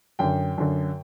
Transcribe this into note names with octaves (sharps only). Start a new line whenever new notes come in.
F#2 D3 G5
F#2 D3